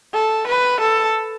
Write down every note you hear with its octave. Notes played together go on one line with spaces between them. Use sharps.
A4
B4
A4